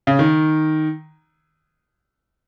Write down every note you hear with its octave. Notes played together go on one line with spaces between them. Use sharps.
C#3
D#3